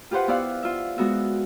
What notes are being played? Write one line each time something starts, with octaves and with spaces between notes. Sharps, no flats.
F4 G4 B4 C5 F#5
B3 E4 D5 F5 F#5
F4 E5
G#3 B3 F#4 E5